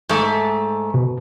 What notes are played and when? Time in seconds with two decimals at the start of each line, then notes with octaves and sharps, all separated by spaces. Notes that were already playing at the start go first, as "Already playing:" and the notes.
0.09 G#2 A3
0.94 B2